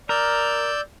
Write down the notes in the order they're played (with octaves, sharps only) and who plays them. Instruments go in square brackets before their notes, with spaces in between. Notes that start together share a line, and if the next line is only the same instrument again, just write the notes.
[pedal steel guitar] A#4 [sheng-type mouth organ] D5 E6 G6